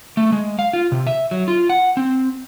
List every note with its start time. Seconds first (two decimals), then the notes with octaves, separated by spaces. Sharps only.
0.17 A3
0.32 G#3
0.59 F5
0.73 F4
0.92 C3
1.07 E5
1.31 F#3
1.48 F4
1.70 F#5
1.97 C4